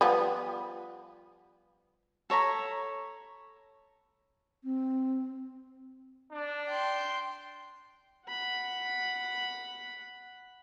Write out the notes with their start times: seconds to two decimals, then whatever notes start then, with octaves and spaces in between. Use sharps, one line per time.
0.01 F3 G3 B3
2.30 A4 C#5 A#5 B5
4.64 C4
6.32 D4
6.69 G5 C6
8.27 F#5 B5